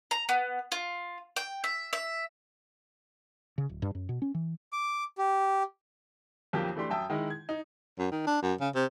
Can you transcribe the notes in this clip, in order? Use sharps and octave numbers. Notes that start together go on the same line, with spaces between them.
A#5
B3
F4
G5
E5
E5
C#3
D1
G2
F#2
B2
C#4
E3
D6
G4
B1 F2 F3 A#3 G4 G6
E3 A3 D4 G4 C6
F#2 E5 G5 A5 D#6 E6
D#3 G#3 D#4 E4
G#6
D#4
F#2
D#3
D4
F#2
C#3
C3